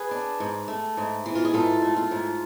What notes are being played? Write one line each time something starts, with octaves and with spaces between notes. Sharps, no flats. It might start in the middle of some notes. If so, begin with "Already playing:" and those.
Already playing: G#4 B4
D4
G#2
A3
G#2
E3
F4
G#4
G#2 F4 A4
A3
F4
G#2